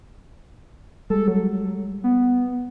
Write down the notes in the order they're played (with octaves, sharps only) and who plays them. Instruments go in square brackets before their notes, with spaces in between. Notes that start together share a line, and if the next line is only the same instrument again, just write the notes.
[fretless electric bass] G3 G#3 [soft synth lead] A4
[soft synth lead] F#3
B3